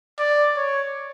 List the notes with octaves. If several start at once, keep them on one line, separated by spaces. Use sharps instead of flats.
D5
C#5